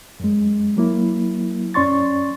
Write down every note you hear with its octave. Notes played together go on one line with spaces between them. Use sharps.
F#2 G#3
F#3 A#3 E4
F#2 C#4 D5 C6 C#6 A6